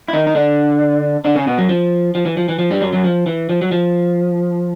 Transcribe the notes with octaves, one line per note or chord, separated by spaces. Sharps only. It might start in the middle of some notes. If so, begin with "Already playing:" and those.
E4
D#3 D#4
D#4
D3 D4
D3 D4
C#3 C#4
B2 B3
F#2 F#3
F3
F3
E3
F3
E3
F3
G2 G3
F#2 F#3
F#2 F#3
F3
E3
F3
F#3
F3